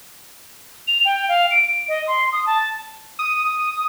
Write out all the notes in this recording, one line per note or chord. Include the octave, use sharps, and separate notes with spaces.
F7
G5
F5
D7
D7
D#5
C6
D#6
A5
D#6